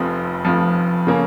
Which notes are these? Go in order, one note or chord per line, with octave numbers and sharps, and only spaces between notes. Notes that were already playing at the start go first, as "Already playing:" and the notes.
Already playing: F1 F2 F3
F1 F2 F3
C#3 A#3 C#4